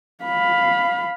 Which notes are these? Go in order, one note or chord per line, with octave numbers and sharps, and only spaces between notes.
F5 B5